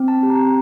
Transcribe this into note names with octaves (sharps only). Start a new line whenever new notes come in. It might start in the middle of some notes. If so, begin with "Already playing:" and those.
Already playing: C4
A5
G4
A#5